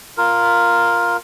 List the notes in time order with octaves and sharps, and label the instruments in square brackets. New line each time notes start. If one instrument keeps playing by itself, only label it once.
[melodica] F4 A#4